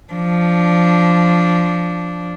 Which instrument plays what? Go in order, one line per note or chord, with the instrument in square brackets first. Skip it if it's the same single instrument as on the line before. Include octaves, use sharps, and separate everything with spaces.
[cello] F3 D4